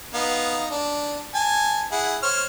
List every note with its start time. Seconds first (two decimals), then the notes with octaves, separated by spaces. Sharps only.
0.14 B3 D#4 F5
0.71 D4
1.34 G#5 A5
1.92 E4 G#4 F#5
2.23 C5 C#5 F6